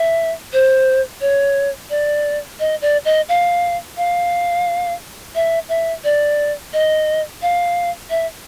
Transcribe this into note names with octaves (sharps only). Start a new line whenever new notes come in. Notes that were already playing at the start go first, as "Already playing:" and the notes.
Already playing: E5
C5
C#5
D5
D#5
D5
D#5
F5
F5
E5
E5
D5
D#5
F5
E5